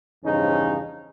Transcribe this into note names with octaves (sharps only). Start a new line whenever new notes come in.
E2 G2 C#3 F3 C#4 D#4